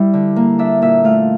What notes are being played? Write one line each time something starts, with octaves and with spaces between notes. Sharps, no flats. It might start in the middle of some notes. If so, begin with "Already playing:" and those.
Already playing: G3 E4
D3
A#3
D4 E5
A#2 E5
A3 F5